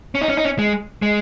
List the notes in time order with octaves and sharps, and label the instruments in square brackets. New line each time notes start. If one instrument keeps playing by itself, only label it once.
[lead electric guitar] C#4
D#4
C#4
D#4
C#4
G#3
G#3